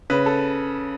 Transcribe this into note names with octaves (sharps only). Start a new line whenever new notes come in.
C#3 B4
A4